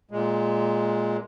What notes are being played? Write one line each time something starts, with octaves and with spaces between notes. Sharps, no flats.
A#2 G#3